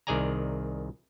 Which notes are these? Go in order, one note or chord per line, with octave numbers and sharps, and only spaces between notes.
C2 D#3 G#4 D5 G#5 A#5